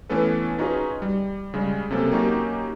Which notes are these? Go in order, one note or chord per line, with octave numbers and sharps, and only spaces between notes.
E3 A3 B3 C#4 A4 B4
C#4 D#4 F4 F#4 G#4 B4
G3
C#3 G3 G#3 C#4
C3 F#3 A#3 C4 C#4 A4
F#3 A#3 C#4 D#4 F#4 G4